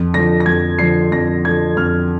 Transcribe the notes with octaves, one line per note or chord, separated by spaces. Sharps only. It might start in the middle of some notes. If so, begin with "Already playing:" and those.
Already playing: F2
D3 F3 A#6
A#6
F2 G#6
D3 F3 C7
F2 A#6
D3 F3 G#6
F2 F6